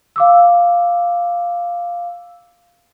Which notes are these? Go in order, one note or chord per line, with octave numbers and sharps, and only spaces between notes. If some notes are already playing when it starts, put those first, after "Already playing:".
F5 D6 E6